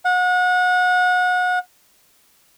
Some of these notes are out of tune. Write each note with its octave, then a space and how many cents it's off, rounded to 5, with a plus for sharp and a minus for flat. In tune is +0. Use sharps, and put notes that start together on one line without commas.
F#5 -30